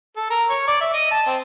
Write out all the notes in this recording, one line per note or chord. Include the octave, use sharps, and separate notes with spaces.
A4
A#4
C#5
D5
E5
D#5
A5
C4